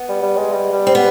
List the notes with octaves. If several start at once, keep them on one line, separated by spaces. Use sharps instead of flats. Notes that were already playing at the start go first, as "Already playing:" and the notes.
Already playing: B3
G3
G3
G#3
G3
G3
C4
B3